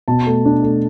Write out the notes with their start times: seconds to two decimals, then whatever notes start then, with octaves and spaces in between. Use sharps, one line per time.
0.08 B2 A5
0.26 A3
0.45 D4
0.63 A3